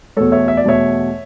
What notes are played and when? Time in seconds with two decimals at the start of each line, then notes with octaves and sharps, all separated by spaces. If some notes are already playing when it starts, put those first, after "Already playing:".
0.16 E2 B2 A3 A4 C#5
0.32 C#5 E5
0.48 E5
0.57 D5
0.64 E2 B2 A3 C#5 E5